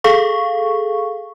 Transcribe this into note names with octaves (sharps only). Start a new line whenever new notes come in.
G#4 A4 F5 C#6